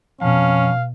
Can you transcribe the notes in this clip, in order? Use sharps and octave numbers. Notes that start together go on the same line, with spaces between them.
F2 B2 C#4 F5